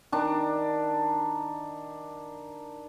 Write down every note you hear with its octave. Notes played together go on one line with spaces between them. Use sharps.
D#3 D4